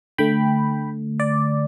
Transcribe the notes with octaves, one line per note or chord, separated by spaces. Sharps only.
D3 A3 G5 B5
D5